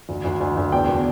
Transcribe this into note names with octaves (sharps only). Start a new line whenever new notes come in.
D2
D2
D2
D2
E2 G5
B2